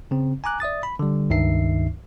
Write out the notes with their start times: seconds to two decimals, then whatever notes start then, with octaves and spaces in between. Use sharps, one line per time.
0.11 C#3 C4
0.44 G#5 A#5 D6 F#6
0.60 D5 E5 D#6 A6
0.83 B5
0.99 D3 G3
1.30 C#2 G2 D#3 D#4 E5 C7